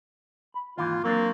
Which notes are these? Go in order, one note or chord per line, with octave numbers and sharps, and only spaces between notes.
B5
D#2 G#2 E3 F4
F#3 A#3 C4 D4